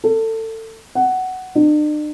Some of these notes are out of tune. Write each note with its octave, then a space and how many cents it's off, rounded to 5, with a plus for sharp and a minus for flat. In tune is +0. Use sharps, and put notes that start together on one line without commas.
A4 +25
F#5 +10
D4 +45